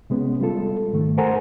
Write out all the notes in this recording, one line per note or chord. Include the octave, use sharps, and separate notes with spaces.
C3 G#3 B3 C#4
G3 G#3 F4 A4
G#2 D#3 A3
A4 A#4 C5 F#5 G#5 A#5